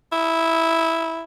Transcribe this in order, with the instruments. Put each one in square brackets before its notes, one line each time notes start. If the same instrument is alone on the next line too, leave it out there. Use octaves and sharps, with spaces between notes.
[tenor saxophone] E4